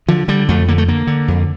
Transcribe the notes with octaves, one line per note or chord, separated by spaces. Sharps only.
D3 F3
D3 G3
F2 A3
D3 A#3
A3
D3 A#3
D3
F2